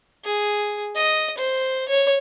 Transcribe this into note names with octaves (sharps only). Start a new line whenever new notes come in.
G#4
D#5
C5
C#5